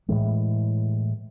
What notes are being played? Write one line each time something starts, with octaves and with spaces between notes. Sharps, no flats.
A2 E3 G#3